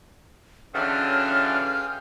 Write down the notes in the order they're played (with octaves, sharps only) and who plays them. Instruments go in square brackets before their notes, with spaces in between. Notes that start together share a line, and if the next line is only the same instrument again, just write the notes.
[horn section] D3 E3 F#3 [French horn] C#4 [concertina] G#4 F5 G5 [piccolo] F6